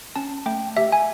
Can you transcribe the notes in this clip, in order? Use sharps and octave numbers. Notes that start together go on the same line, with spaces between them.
C#4 A5
A3 G5
G4 E5
G#5